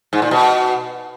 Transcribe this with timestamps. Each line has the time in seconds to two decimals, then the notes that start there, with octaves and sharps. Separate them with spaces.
0.13 G#2
0.22 A#2
0.31 B2